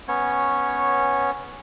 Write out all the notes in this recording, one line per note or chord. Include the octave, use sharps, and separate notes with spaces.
B3 C#4 C#5